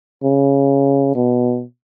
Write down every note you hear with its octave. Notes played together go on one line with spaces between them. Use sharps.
C#3
B2